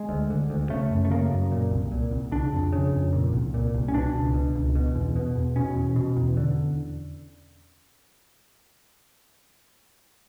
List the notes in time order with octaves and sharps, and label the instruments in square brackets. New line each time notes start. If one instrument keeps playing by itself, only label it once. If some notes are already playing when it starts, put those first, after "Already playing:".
Already playing: [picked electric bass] G#3
D2
D3
D2
C#3 A3
F#2
A3
C#3 A#3
F#2
A#2
C2
A#2
C2
C#3 D4
F2
C#3
F2
A#2
C2
A#2
C2
C#4
B2 D4
C#2
B2
C#2
B2
E2
B2
E2
B2 C#4
E2
B2
E2
D3